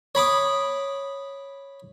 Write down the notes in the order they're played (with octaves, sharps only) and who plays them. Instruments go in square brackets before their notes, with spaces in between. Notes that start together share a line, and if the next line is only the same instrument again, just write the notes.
[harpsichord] C#5 B5 D6 D#6